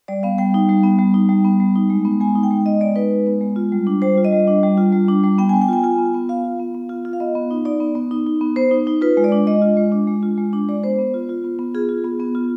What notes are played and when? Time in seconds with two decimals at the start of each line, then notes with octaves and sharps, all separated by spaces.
0.08 G3 D5
0.23 B3 F5
0.38 G3 G5
0.54 D#4
0.69 G3
0.83 B3
0.99 G3
1.14 D#4
1.29 G3
1.45 B3
1.60 G3
1.75 D#4
1.90 G#3
2.05 B3
2.21 G#3 G#5
2.36 D#4
2.43 G5
2.51 G#3
2.66 B3 D#5
2.80 G#3 D5
2.96 D#4 B4
3.11 G#3
3.27 B3
3.41 G#3
3.56 F4
3.72 G3
3.87 D4
4.02 G3 C5
4.17 F4
4.25 D#5
4.32 G3
4.47 D4
4.63 G3
4.77 F4
4.92 G3
5.08 D4
5.23 G3
5.38 B3 G5
5.49 G#5
5.53 B3
5.61 G5
5.69 F4 G#5
5.83 F4 G#5
5.98 B3
6.14 B3
6.29 F4 F5
6.44 F4
6.60 B3
6.74 B3
6.89 F4
7.05 F4
7.13 F5
7.20 B3 D#5
7.35 B3
7.50 D#4
7.65 D#4 D5
7.80 B3
7.95 B3
8.11 D#4
8.27 D#4
8.41 B3
8.56 B3 C5
8.71 D#4
8.87 D#4
9.01 F4 B4
9.17 G#3
9.24 D5
9.32 D4
9.47 G#3 D#5
9.62 F4
9.77 G#3
9.92 D4
10.08 G#3
10.23 F4
10.37 G#3
10.53 D4
10.69 G#3 D5
10.83 B3 C5
10.98 B3
11.14 F4
11.29 F4
11.44 B3
11.59 B3
11.74 F4 G#4
11.89 F4
12.04 B3
12.20 B3
12.35 F4